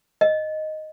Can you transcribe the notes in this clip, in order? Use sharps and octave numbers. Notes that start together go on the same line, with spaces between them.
D#5